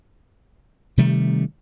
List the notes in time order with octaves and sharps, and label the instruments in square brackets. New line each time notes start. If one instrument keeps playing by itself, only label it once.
[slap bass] C3 D#3 G3 A3